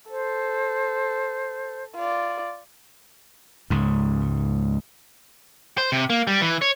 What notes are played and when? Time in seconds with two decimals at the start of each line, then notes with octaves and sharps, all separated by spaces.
0.10 A4 C5
1.95 F4 D5
3.70 C#2 G#2
5.78 C5
5.92 C3
6.10 A#3
6.27 G3
6.41 E3
6.62 C#5